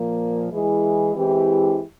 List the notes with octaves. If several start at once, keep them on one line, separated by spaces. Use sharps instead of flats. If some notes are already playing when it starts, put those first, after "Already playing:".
Already playing: A#2 F3 A#3
E3 G#3 E4 G#4
E3 G#3 C4 E4 G4